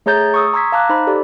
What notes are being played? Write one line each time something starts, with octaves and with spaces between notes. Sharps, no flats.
A3 G#4 C#5 A#5 G6 A6
C#6 D#6 E6
A#5 C6 E6 G#6 B6
F5 A5 A#5 D6 F#6
D#4 C5 B5
G4 A4 D5